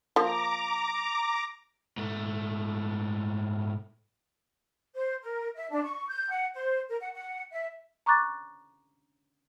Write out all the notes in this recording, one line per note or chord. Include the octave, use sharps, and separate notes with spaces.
F3 A#3 A#5 D6
G#2 A3
C5
A#4
E5
D4
C#6
G6
F#5
C5
A#4
F#5
F#5
E5
A#5 C#6 D6 F#6 A6